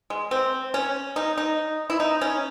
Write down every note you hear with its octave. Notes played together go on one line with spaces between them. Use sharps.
G#3
C4
C#4
D#4
D#4
E4
D#4
C#4